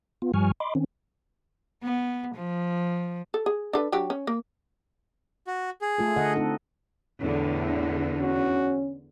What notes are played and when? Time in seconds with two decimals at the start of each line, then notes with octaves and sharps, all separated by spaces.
0.22 B3 F4
0.34 G2 F3 G3 G#5 C#6 F6
0.60 D#5 B5 C6 D6
0.75 D#3 C4 C#4
1.83 B3
2.35 F3
3.34 A4
3.46 G#4
3.73 D4 A4 B4
3.92 F#3 D4 G4
4.10 C#4
4.27 A#3
5.47 F#4
5.82 G#4
5.98 A3 F4 A4
6.17 D3 D#5 F#5
6.36 C4 D#4 A4
7.23 E2 A2 D3
8.21 C#4 F#4